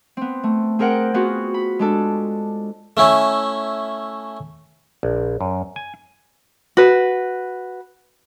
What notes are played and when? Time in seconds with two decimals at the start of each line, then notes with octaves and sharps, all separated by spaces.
0.17 B3 C4
0.43 A3
0.79 C4 G#4 A#4 C5 F#5 G5
1.14 B3 C4 F4 F#4 G#4
1.54 B5
1.79 G#3 D4 A4
2.97 A3 C#4 E4
5.03 A#1
5.41 F#2
5.76 G#5
6.77 F#4 B4